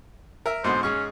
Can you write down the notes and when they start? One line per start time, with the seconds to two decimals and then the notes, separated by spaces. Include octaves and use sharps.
0.46 A#4 E5
0.64 G#2 B2 D3 C5
0.83 G#2 C#4 G#4 C#6